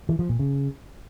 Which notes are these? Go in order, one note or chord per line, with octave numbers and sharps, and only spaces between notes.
E3
F3
A#2
C#3